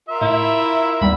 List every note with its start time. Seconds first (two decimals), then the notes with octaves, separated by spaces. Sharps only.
0.09 F4 A#4 E5
0.21 A2 E4
1.01 D#2 G3 B3 B5